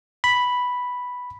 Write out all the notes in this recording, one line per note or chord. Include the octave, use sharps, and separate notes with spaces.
B5